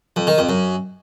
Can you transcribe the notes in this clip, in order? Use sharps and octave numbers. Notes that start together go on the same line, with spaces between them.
F2
D#3
F2
F#2